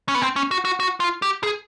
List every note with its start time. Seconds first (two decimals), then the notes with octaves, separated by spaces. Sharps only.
0.08 C#4
0.15 B3
0.22 C4
0.36 C#4
0.51 F#4
0.65 F#4
0.80 F#4
1.00 F4
1.22 G4
1.43 G#4